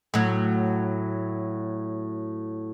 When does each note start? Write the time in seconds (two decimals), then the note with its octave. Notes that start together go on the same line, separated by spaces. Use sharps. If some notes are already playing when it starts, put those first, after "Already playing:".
0.14 A2 F#3